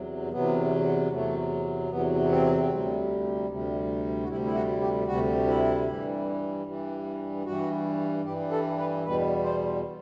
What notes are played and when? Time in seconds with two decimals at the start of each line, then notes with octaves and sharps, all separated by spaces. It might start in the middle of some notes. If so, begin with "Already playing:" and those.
Already playing: E2 C3 F#3
0.31 E2 C3 F#3 B3
1.11 E2 C3 F#3 A3
1.90 E2 C3 F#3 B3
2.30 C4
2.69 D2 C3 G3
3.49 D2 C3 G3
4.23 F#4
4.28 D2 C3 G3 E4
4.44 E4
4.54 F#4
4.81 G4
5.07 D2 C3 G3 F#4
5.47 E4
5.87 G2 E3 G3
6.66 G2 E3 G3
7.46 G2 E3 G3 F#4
8.25 G2 E3 G3 G4
8.51 A4
8.78 B4
9.05 E2 B2 G3 B4
9.44 C5